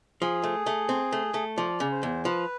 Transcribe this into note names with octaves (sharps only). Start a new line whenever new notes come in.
F3 G#4
A3
A3
C4
A3
A3
F3 D5
C#3
C5
E2
F3 B4